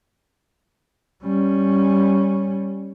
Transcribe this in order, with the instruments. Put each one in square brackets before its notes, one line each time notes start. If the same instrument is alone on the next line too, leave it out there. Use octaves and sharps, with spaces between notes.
[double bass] G3 C#4